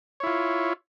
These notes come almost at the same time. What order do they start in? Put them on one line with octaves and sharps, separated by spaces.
C#5 E4 F4